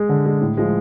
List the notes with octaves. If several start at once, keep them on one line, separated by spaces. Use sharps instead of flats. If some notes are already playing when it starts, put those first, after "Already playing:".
Already playing: G#3 G#4
D3
G#3
A2
F3 G#3